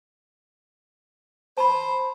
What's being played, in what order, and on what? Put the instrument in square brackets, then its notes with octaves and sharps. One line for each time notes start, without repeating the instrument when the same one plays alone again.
[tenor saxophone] C5 [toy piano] A5 B5